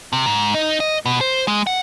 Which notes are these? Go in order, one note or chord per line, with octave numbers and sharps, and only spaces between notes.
C3
G#2
D#4
D#5
B2
C5
G#3
F#5